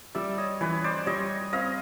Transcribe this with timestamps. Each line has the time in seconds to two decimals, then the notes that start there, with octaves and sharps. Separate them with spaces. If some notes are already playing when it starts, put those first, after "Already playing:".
0.15 G3 D5 E5
0.38 C#5 D#5
0.61 E3 B4 C#5
0.84 C5 D5
1.06 G3 C#5 D#5
1.53 C4 D#5 F5